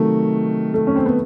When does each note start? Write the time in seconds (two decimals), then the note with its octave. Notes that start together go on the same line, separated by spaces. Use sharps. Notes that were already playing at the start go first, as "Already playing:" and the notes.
Already playing: C3 D#3 F#3 A3
0.74 A3
0.87 C#4
0.96 C4
1.06 B3